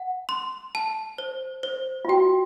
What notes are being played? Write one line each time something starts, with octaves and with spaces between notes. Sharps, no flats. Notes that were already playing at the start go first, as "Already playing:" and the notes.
Already playing: F#5
C6
A5
C5
C5
F4
F#4 G5